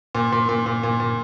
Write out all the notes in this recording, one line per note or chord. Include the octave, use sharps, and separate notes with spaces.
A#2
A#2
A#2
A#2
A#2
A#2